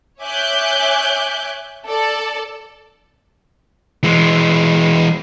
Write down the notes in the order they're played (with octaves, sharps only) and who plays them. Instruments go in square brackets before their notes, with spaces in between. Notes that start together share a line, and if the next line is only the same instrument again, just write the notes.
[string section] C#5 E5 G#5 D6 F#6 G6
A4 D5 A5
[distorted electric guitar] E3 G#3